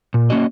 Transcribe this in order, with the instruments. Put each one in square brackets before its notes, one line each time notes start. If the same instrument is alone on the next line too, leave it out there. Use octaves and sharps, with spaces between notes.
[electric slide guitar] A#2
A#3 C#4 F#4 D#5